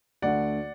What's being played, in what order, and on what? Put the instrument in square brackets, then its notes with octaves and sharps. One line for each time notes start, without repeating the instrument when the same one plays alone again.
[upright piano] D2 D3 A3 D5 F#5